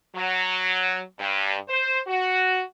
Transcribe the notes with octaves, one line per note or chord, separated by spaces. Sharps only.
F#3
G2
C5
F#4